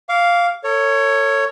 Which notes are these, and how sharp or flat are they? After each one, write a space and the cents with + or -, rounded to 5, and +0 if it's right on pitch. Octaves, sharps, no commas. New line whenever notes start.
F5 +0 D6 -35
A4 +40 C#5 +0